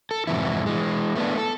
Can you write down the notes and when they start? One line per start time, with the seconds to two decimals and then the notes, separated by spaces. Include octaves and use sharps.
0.11 A4
0.27 F2 G#2 C3 E3 E4
0.66 E3 G#3
1.16 A3 B3 D4
1.37 A4